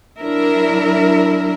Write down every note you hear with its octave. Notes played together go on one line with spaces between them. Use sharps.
F#3 D4 E4 A#4 E5